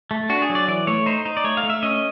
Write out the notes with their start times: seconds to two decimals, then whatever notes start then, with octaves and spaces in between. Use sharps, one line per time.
0.11 A3
0.29 D4 F#4
0.42 G#4
0.50 F#3
0.55 D5
0.68 E3 D5
0.87 A3 C#5
1.06 D#4 C5
1.25 D#4
1.37 D5
1.44 A3 C#5
1.57 F5
1.63 A3
1.70 E5
1.83 C#4 D#5